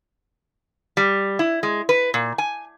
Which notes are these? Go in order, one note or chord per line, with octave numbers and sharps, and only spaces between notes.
G3
E4
G#3
B4
A#2
G#5